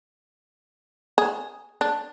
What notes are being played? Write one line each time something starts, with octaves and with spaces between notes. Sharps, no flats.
G#4
D4